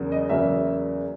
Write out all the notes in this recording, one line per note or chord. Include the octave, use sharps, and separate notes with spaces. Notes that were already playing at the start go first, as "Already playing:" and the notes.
Already playing: E2 C#3 F#3 A#3
D#5
E2 C#3 F#3 A#3 E5